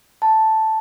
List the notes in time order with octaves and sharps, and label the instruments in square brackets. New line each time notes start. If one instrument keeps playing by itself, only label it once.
[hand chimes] A5